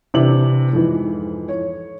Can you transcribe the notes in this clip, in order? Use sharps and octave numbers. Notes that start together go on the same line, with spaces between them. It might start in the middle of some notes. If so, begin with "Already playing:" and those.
C3 E3 C4 D4 F#7
F2 G#2 E3
C#5